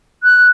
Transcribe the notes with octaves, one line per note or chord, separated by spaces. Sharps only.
F#6